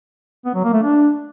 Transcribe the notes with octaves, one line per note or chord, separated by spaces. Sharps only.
B3
F#3
A#3
A3
D4